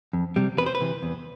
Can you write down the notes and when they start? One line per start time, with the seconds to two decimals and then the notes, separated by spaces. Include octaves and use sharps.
0.13 F2
0.36 C3 G3
0.58 E2 B4
0.66 C5
0.75 B4
0.81 C3 E3
1.03 E2